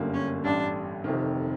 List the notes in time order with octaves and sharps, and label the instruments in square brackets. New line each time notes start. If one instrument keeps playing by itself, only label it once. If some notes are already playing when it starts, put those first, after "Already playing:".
Already playing: [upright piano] G1 F#2 D3 G3 A#3
[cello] C#4
[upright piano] A1 G2 D3 G3 [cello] D4
[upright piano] F1 F2 C3 D#3